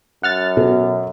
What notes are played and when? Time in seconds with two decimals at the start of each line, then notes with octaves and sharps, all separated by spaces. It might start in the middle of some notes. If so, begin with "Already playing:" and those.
0.23 F#2 F#5 F6 A6
0.57 B2 A4